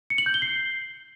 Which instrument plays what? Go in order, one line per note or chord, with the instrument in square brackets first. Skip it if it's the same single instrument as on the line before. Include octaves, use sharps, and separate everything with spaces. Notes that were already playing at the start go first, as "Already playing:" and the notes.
[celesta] C#7
F#7
G6
G7
C7